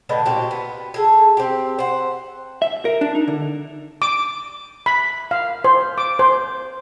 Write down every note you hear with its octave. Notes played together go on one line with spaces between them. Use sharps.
A2 D3 B3 D#5
A#2 C4 F#4 G4
B3
G#4 A4
C4 G4
C5 F#5
E5
A#4
D4
D#4
D3
D6
B5
F5
C5
D6
C5